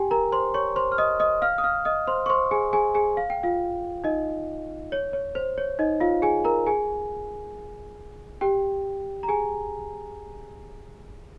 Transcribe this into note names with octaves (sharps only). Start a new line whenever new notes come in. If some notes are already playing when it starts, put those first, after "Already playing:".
Already playing: G4 G5 G#5
A#4 A#5
C5 C6
C#5 C#6
C5 C6
F6
D#5 D#6
D#5 D#6
F5 F6
D#6
F5 F6
D#5 D#6
C5 C6
C#6
C5 C6
G#4 G#5
G#4 G#5
G#4 G#5
F5
G5
F4 F5
D#4 D#5
C#5
C#5
C5
C#5
D#4 D#5
F4 F5
G#4 G#5
A#4 A#5
G#4 G#5
G4 G5
A#5
G#4 G#5